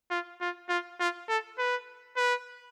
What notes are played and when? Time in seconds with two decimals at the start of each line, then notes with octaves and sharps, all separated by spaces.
0.11 F4
0.41 F4
0.69 F4
1.00 F4
1.29 A4
1.58 B4
2.17 B4